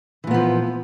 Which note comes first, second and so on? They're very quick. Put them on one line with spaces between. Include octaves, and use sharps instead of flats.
E3 A#2 B3 F3